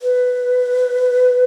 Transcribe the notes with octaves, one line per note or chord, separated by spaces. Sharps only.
B4